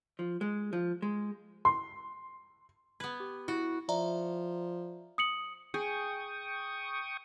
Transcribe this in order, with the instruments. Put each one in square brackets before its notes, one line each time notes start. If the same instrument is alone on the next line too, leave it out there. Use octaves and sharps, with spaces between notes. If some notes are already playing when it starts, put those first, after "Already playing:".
[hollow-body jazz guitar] F3
G#3
F3
G#3
[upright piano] C6
[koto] B3 B4 [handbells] G#6
[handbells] G4
[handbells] E4 [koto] F#4
[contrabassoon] F3 [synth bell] D5 E5 A#5
[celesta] D#6 C#7 F#7
[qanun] G#4 [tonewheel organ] G5 C#6 D#6